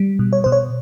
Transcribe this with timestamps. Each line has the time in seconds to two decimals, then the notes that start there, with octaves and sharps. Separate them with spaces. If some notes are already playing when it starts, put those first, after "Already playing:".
Already playing: G3
0.19 B2
0.33 C#5
0.44 B2 C5
0.52 C#5